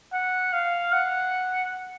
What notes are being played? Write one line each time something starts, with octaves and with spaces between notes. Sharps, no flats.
F#5
F5
F#5